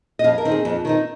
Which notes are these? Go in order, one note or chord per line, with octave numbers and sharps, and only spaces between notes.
D#5
F2 F5
A#4
D#3 C4 D#4
G#4
F2
D#3 C4 D#4